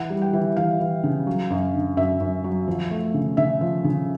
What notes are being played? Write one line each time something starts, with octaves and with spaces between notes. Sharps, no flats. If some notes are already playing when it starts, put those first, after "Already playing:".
Already playing: E3 F#5
G3
G5
E3
E3 F5
E3
C#3
F#3
F#2
D3
F#2 E5
F#2
F#3
F3
A3
C#3
C#3 E5
F3
C#3